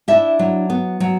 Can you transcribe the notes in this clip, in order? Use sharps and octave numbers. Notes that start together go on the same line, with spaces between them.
D4 E4 E5
F#3
B3
F#3